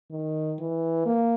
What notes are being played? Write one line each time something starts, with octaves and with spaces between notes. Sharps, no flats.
D#3
E3
A#3